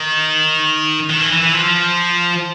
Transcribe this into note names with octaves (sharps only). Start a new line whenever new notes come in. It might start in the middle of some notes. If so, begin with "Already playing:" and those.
Already playing: D#3
D#3
E3
E3
E3
F3